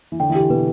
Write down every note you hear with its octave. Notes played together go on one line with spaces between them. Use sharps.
E3
D3 G5
E3
G4
D3
B2 B4